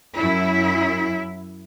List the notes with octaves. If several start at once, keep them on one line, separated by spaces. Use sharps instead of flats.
F#2 E4